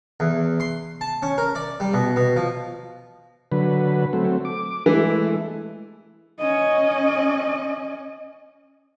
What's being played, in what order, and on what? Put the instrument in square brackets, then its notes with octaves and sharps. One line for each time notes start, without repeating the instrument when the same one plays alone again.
[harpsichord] E2
C6
A5
C#4
A#4
D5
G3
B2
B2
F3
[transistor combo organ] D3 F#3 B4
F#3 A3 C4
D6
[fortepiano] E3 [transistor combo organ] G#3 A3 E4
[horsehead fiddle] C#4 D#5